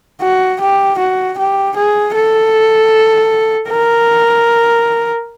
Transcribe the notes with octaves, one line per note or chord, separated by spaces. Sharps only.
F#4
G4
F#4
G4
G#4
A4
A#4